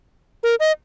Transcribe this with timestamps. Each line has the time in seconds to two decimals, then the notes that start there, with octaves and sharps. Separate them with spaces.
0.43 A#4
0.60 D#5